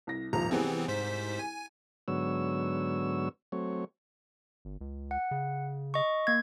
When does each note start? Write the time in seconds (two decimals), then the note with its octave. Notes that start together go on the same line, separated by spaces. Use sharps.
0.07 C2 A#6
0.33 D#1 G#1 F3 A#5
0.51 C2 E3 G3 B3 C4 G#4
0.88 G#2 C5 B6
1.39 G#5
2.08 G#2 D3 F#3 B3 C#5 E6
3.52 F#3 A3 C4 C#5
4.65 G1
4.81 C#2
5.11 F#5
5.31 C#3
5.94 D#5 C#6
6.27 A#3 G#6